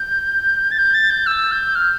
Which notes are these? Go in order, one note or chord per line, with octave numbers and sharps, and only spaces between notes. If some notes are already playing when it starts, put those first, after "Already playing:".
Already playing: G6
A6
G6
A6
G6
E6
G6
F6